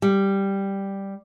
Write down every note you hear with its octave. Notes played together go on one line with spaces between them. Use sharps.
G3